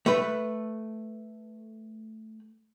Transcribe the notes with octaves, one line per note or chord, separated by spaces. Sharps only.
A3 B4